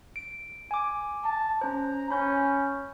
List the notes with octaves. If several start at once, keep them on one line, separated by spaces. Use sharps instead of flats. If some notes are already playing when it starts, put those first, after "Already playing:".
D7
G#5 D6
A5
C#4 C5 A#5
C#4 B5 G6